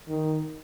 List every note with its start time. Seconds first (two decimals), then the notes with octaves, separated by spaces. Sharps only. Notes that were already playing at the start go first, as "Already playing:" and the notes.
0.08 D#3